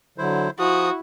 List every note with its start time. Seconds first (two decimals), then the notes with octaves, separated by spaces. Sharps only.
0.18 D3 F#3 E4 C5
0.59 F3 E4 F#4 D#6